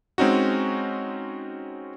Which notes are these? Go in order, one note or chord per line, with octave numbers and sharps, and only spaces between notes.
G#3 C4 C#4 D#4 F#4